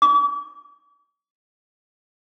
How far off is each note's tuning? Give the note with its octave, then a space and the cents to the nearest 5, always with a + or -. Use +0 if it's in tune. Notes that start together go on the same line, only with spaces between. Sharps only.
D6 -45